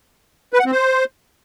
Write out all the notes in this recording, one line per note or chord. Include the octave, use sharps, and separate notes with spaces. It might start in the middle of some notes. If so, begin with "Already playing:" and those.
B4
F#5
C4
C5